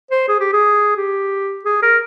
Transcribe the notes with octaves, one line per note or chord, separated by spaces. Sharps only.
C5
G#4
G4
G#4
G4
G#4
A#4